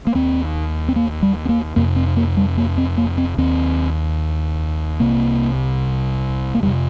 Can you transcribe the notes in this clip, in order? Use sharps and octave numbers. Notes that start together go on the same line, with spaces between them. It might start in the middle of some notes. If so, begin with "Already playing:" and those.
A#3
D#2 C4
C4
A#3
G3
C4
A#3
F2 C3 A#3
C4
A#3
G3
A#3
C4
A#3
C4
D#2 C4
C2 C3 A#3
A#3
F2 C3 G3